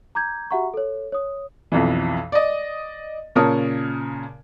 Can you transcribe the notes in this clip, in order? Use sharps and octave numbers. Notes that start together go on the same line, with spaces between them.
A#5 D6 G6 G#6
F#4 G4 E5 F#5 A#5 C#6
A4 C#5
C#5 D#6
B1 F2 E3
D5 D#5
A#2 C#3 A#4 C#5 A5 D#6